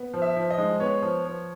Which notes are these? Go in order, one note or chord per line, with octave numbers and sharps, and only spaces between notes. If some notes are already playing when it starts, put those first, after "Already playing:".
Already playing: B3
F3
E5
F3
D#5
G#3
B3 C#5
F3
F3